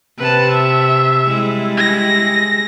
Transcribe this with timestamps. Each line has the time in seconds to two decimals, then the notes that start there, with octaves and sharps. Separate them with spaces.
0.19 C3 B4 A5
0.51 E5
1.27 G3 G#3 E4
1.77 A#6